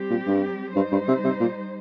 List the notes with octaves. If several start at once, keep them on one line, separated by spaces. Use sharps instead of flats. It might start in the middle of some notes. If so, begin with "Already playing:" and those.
Already playing: G3 C4 G4
A#2
G2
G2 G3 D#4 C5
G2
C3
C3
A#2